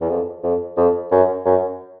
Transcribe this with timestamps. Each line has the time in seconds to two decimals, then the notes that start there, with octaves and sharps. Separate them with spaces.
0.01 E2
0.09 F2
0.43 F2
0.77 F2
1.12 F#2
1.46 F#2